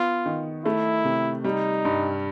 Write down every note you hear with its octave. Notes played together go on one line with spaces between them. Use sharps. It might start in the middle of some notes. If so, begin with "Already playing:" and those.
Already playing: B3 F4
D#3
A3 E4
C3
G3 D#4
G2